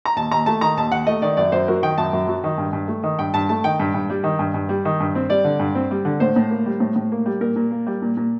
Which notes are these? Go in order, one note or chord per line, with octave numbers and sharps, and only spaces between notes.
A#5
D#2 A5
D#2 A#5
A3 A5
D#3 A#5
D#2 A5
D#2 F#5
A3 D#5
D#3 D5
F#2 D5
F#2 C5
F#3 A#4
D#3 G5
F#2 A5
F#2
F#3
D#3
G2
G2
A3
D#3
G2 G5
G2 A5
A3 A5
D#3 G5
G2
G2
G3
D#3
G2
G2
G3
D#3
G2
C4
G3 D5
D3
G2
C4
G3
D3
A2 C5
A2
A#3
G3
A2
A2
A#3
G3
A#2 A#4
A#2
A#3
G3
A#2
A#2